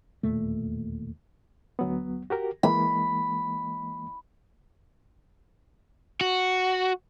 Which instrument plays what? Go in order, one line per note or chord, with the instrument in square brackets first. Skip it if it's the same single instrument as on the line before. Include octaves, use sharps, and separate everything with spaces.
[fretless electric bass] E1 D#2 A#2 A3
[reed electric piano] D2 F#3 B3
F#4 G4 A#4
[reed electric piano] E3 G#3 A#3 [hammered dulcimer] B5
[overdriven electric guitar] F#4